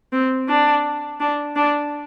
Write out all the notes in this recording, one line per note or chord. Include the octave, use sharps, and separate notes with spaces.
C4
D4
D4
D4